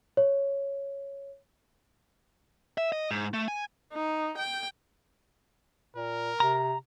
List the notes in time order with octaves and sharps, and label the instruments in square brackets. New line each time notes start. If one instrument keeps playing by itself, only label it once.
[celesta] C#5
[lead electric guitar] E5
D#5
G#2
A3
G#5
[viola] D#4
G5
[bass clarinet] A#2 [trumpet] A#4
[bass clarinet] C3 [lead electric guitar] A#5